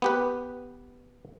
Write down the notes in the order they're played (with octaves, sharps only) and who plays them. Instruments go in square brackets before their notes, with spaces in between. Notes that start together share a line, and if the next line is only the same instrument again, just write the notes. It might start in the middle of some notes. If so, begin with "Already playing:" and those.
[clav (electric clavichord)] B3 G4 B4